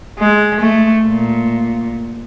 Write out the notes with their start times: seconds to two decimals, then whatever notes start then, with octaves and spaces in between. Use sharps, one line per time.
0.19 G#3
0.61 A3
1.07 A#2